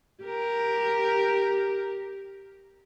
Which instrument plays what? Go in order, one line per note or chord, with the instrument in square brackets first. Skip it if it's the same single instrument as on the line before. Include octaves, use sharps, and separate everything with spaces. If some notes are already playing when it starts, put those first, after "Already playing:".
[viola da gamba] G4 A#4